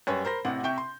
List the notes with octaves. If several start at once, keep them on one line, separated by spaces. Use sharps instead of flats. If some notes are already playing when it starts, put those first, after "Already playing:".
F#2 G3 B4 C#5 G#5 C#6
A#4 C5 B5 A#6
A1 C3 F#5
C3 E5 G5 C#6 G6
C6